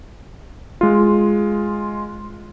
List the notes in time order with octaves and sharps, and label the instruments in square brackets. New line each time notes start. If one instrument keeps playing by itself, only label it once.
[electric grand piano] G#3 F4